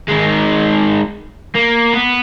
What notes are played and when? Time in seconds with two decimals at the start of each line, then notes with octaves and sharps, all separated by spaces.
0.08 D#3 G#3
1.55 A#3
1.94 B3